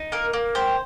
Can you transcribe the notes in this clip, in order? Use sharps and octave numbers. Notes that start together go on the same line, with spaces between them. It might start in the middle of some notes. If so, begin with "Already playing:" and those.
Already playing: D#4
A#3 A#4
A#3
G4 C5